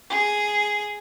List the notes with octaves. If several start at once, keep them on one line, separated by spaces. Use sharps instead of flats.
G#4